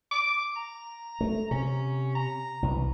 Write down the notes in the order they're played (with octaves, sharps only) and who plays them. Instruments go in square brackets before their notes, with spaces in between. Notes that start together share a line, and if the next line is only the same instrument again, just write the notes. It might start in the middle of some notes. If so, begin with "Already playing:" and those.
[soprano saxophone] D6
A#5
[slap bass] A3
[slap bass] C3 [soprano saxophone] C#4
[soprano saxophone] A#5
[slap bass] C2 E3